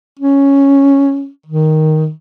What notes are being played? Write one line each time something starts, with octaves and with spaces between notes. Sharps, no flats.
C#4
D#3